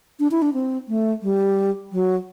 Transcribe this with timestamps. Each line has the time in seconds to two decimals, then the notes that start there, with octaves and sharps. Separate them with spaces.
0.20 D4
0.31 E4
0.42 D4
0.54 C4
0.88 A3
1.23 G3
1.92 F#3